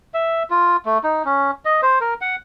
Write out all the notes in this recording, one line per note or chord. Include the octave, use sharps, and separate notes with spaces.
E5
F4
A3
D#4
C#4
D#5
C5
A#4
F#5